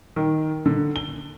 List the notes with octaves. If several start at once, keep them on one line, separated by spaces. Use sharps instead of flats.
D#3
D3
G7